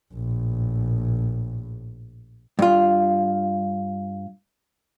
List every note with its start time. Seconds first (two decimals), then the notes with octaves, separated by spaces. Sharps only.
0.13 A#1 A2
2.59 G2 F4